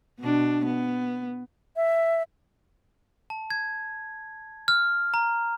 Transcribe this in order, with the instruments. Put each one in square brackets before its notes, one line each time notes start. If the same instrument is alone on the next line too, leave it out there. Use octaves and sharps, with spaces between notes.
[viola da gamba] B2 D4
B3
[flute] E5
[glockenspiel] A5
G#6
F6
A#5